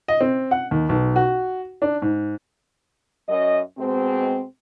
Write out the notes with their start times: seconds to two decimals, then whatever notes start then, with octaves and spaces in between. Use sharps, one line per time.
0.08 D#5
0.21 C4
0.51 F#5
0.71 D#2
0.89 B1
1.16 F#4
1.82 D4
2.02 G#2
3.29 F#2 D#5
3.78 B2 G#3 C4